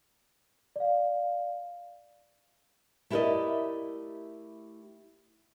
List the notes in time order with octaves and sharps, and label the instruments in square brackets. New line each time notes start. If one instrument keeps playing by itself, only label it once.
[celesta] D5 F5
[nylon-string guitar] A3 E4 G4 A#4 D5 D#5